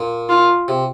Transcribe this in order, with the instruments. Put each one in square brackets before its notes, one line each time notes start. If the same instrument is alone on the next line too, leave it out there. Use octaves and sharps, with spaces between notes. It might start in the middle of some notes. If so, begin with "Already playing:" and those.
Already playing: [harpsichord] A#2
[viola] F4
[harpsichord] C3